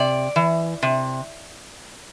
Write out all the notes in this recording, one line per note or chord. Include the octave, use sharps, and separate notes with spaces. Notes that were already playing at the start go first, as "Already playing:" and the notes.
Already playing: C3 D5
E3
C3